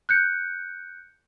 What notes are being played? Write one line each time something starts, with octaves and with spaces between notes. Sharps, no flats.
F#6 G6 C#7